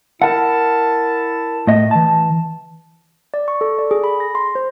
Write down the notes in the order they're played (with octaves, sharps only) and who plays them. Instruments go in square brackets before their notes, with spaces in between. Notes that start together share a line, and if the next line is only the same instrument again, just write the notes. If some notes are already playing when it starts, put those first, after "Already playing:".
[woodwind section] E4 A5 [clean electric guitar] A#4 F#5
[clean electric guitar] A2 D#5
E3 A5
[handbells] D5
C#6
A4
D5
G#4
B5
A#6
C6
C5